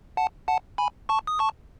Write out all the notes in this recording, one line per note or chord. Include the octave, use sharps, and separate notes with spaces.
F#5 A5
F#5 A5
G#5 B5
A5 C#6
D#6
A5 C#6